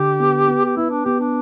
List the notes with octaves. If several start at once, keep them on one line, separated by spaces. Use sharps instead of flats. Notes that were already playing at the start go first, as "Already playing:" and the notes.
Already playing: D3 G4
B3
B3
G4
B3 E4
D4
B3 G4
D4